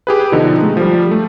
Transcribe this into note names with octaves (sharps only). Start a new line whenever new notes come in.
G4 G#4 B4
B2 D3 F3 D#4
G#3 A3
F3 G3
A3